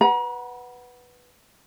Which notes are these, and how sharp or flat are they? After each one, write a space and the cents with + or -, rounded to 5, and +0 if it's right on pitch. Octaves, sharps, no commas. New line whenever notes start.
B4 +0 F#5 +0 A#5 +40